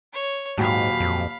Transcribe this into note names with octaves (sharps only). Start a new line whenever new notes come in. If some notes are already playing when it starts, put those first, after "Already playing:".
C#5
D#1 G#2 F#3 F5 G5 B5
F2